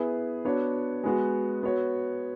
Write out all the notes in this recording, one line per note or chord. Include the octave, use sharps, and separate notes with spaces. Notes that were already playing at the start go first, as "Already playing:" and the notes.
Already playing: B3 E4 G#4 B4
B3 D4 F#4 C#5
G#3 B3 F#4
B3 F#4 C#5